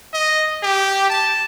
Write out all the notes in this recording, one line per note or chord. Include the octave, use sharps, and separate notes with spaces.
D#5
G4
A5